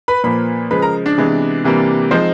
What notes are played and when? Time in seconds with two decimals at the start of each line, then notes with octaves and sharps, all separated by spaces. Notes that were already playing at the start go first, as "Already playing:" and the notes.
0.08 B4 B5
0.24 A#2 F3 A#3 B4 B5
0.71 C#3 F3 G#3 B4 B5
0.82 A#4 A#5
1.06 D4 D5
1.18 C3 E3 G#3 B3
1.64 C3 E3 G3 A#3
2.11 F3 G#3 C4 D#4 C5